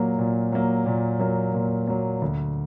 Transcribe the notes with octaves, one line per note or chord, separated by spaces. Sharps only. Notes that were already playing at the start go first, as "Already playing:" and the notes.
Already playing: A#2 F#3 A#3
A#2
F#3 A#3
A#2
F#3 A#3
A#2
F#3 A#3
D2